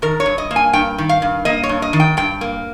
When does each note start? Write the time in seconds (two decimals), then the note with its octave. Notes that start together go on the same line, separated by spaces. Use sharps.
0.02 D#3 A#4
0.20 C#5
0.26 G2
0.38 D#5
0.51 A#3
0.56 G#5
0.73 G2 G5
0.98 D#3
1.09 F5
1.22 G2
1.45 A#3 D#5
1.63 C#5
1.69 G2
1.82 D#5
1.93 D#3
2.00 G5
2.17 G2 G5
2.41 A#3